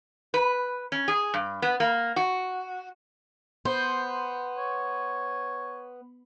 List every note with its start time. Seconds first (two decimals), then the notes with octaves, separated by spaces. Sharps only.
0.34 B4
0.92 C#4
1.08 G#4
1.34 G2
1.62 B3
1.80 A#3
2.16 F#4
3.65 B3 C5
4.58 C#5